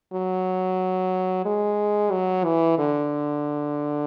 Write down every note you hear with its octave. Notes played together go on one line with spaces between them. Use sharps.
F#3
G#3
F#3
E3
D3